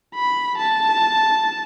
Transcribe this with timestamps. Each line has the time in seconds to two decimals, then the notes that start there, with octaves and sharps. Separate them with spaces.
0.15 B5
0.58 A5